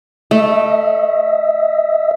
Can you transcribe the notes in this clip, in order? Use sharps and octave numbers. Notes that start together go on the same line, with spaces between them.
A3 D#5 E5